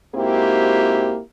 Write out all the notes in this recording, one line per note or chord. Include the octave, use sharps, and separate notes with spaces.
G#2 A#3 C4 E4 F#4 G4